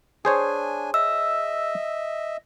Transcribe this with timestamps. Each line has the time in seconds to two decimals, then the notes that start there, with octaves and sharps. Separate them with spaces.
0.25 D4 G#4 C5 C#5 G#5
0.94 D#5 E5 E6